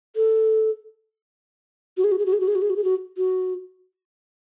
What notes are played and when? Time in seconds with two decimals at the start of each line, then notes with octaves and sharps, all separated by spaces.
0.16 A4
1.97 F#4
2.04 G#4
2.12 F#4
2.19 G#4
2.26 F#4
2.33 G#4
2.40 F#4
2.48 G#4
2.55 F#4
2.62 G#4
2.70 F#4
2.76 G#4
2.84 F#4
3.17 F#4